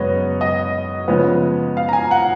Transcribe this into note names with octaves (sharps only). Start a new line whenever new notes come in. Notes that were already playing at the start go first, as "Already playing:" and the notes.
Already playing: F#2 C#3 G#3 B3 C#5 D#5
D#5
C#3 F3 G#3 B3
F5
A#5
G#5
F#5